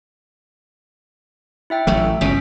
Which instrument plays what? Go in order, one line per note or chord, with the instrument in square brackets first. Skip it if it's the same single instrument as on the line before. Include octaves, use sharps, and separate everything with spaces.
[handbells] E4 E5 G5
[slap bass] A1 F#3 A3 [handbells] E5
[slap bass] G1 C#2 B2 [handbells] C#4 B6